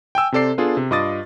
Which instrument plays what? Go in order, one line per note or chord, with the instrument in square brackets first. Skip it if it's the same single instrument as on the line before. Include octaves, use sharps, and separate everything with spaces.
[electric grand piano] G5 G#5 E6
C3 C4 A4 D5 C7
B3 D4 F4 G#4 A4
C3
G2 F4 D#5 D6 D#6 A6